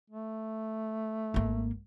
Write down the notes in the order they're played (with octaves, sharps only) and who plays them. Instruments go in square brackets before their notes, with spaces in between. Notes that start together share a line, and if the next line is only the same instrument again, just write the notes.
[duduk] A3
[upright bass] G#1 A#3